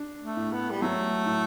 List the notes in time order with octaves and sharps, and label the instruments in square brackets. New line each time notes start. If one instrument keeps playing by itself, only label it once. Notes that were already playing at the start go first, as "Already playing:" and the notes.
Already playing: [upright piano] D4
[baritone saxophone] A3
[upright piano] A2
[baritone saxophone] B3
G3
[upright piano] F#3 [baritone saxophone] A3
[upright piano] A2